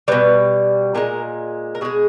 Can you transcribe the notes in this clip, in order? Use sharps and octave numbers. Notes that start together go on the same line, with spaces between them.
B2 G3 B4
A#2 G#3 A#4
A#4
B2 G#3 G#4